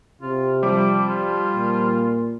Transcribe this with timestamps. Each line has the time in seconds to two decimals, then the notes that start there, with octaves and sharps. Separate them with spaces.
0.21 C3 F4
0.63 F3 G3 D6
1.07 F4
1.54 A#2